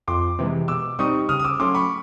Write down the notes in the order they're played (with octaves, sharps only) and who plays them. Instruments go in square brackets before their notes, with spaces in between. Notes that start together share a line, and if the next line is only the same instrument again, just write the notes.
[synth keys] F2 [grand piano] C6 D6
[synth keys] C3 E3 G#3
[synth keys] B2 [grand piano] D6 E6
[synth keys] G3 C4 D#4 [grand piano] C#6 D#6
[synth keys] C#3 [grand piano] D#6 F6
[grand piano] D#6
D6 E6
[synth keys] F#3 A3 C#4 [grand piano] C6 D6
[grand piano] B5 C#6